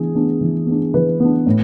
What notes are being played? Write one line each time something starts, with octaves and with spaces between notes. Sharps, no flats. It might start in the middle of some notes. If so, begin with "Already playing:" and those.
Already playing: E3 B3 D4 G#4
B3 D4
E3
B3 D4
E3 B4
B3 D4
A2